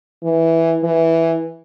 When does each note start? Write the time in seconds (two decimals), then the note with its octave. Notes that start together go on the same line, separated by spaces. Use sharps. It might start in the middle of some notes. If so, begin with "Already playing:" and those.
0.23 E3
0.83 E3